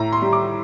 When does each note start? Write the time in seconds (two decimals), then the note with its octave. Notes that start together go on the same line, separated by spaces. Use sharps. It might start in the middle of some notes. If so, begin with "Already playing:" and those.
Already playing: A2 A#5
0.13 C6
0.22 G3
0.33 D6